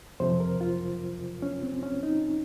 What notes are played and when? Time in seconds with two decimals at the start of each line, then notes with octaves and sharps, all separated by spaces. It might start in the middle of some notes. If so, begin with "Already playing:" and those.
0.20 F2 C3 F3 C5
0.40 A#4
0.61 F4
1.42 C#4
1.63 C4
1.83 C#4
2.03 D#4